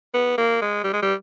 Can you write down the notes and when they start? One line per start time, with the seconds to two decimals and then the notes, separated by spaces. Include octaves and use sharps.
0.14 B3
0.38 A#3
0.61 G#3
0.84 G3
0.93 G#3
1.02 G3